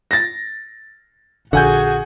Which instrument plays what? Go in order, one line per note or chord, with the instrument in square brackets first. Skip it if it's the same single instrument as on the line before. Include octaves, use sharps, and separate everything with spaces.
[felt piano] A6 A#6
[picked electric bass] A#1 D3 [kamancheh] F#4 G#4 [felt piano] F#5 G#5 G6